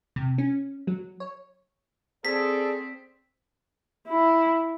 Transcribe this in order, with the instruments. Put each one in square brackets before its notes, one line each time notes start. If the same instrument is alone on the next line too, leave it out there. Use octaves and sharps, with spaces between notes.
[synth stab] C3
C#4
F#3
C#5
[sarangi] C4 [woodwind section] G#4 D5 [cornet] A4 [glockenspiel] B6
[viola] E4